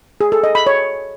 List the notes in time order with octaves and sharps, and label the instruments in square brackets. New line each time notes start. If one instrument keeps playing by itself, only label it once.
[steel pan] G#4
A4
D#5
B5
C#5